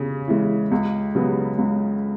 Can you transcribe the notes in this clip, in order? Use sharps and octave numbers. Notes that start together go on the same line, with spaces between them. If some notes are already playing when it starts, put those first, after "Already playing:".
Already playing: C#3
E3 G#3
C#2
C#3 F#3 B3
C#2